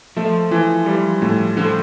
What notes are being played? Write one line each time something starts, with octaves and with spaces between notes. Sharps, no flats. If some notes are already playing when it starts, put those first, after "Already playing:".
F3 A3
E3
G3
A2
D3 F3